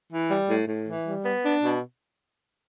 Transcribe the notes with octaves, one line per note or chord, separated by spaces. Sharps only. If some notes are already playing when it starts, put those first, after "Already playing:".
E3
G3
A2
A2
E3
G3
B3
D4
B2